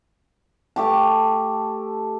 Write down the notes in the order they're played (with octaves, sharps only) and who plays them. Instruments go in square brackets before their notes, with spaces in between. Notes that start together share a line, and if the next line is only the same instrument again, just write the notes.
[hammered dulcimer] A3 G4 A5